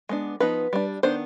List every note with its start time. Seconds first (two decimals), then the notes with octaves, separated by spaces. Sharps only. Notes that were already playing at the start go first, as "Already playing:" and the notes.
0.09 G#3 B3 D4
0.40 F3 B3 D#4 B4
0.73 G3 D4
1.03 D#3 B3 D4 C5